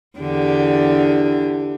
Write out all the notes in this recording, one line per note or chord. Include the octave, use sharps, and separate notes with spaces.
E2 D3 G4